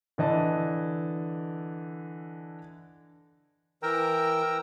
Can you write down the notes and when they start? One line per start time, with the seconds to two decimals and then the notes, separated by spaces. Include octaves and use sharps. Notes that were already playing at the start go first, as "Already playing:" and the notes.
0.18 D3 E3 D#5 A5
3.83 E3 A#4 G5 A#5 E6